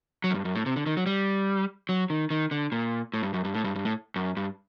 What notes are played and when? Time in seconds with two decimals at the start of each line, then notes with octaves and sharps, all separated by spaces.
0.24 F#3
0.31 F#2
0.35 G2
0.45 F#2
0.55 A2
0.66 C3
0.76 D3
0.86 D#3
0.97 F#3
1.06 G3
1.89 F#3
2.10 D#3
2.30 D#3
2.51 D3
2.72 A#2
3.14 A2
3.23 G2
3.34 F#2
3.45 G2
3.54 A2
3.64 G2
3.76 G2
3.85 A2
4.16 F#2
4.37 G2